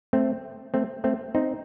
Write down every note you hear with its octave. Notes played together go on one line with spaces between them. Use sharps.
A3 C4
A3 C4
A3 C4
C4 D#4